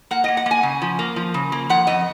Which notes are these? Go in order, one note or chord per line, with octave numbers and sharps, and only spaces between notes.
A#3 F#5
D#5
A#3
F#5
A#3 G#5
C#3
F3
A#3
F3
C#3
A#3
F3 F#5
F2 D#5